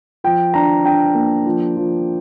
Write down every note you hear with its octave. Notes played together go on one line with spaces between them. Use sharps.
F3 G5
D4 A#5
D4 G5
A#3
F3
F3